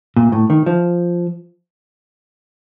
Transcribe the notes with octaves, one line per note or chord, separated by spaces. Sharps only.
A#2
A2
D#3
F3